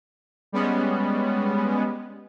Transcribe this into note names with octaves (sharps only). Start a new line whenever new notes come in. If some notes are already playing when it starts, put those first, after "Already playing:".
G3 G#3 B3 C#4